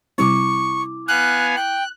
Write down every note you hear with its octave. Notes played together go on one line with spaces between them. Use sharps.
C3 G3 C4 E4 C#6 D6
B3 F5 G#5 F#6
G5 F#6